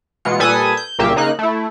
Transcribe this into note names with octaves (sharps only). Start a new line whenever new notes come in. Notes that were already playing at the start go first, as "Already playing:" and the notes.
B2 E3 G#3 F4 C#7
A#2 G3 A4 B4 G#5 D#6
G6
C2 A#2 C#3 A#3 G4 E5
C#3 A#3 D#4 F#6
A3 E4